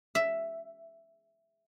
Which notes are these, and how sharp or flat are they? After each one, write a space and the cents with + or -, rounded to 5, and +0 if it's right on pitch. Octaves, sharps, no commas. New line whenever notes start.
E5 +5